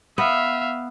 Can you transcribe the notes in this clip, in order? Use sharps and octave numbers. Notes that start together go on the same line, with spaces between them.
B3 E5 F5